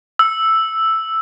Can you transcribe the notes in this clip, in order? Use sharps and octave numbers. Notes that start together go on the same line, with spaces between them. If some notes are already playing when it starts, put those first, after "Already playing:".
E6